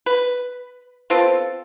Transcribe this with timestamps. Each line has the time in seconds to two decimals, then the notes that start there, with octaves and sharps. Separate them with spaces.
0.06 B4
1.10 B3 C4 F4 A4